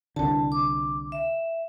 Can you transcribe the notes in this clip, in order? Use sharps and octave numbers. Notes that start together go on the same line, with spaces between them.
C2 D3 A5
D6
E5